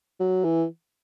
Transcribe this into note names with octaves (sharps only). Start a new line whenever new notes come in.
F#3
E3